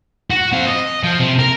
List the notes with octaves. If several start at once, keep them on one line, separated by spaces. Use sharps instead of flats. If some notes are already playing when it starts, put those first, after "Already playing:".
F#4
C4 F5
D#5
F3
C3
A#4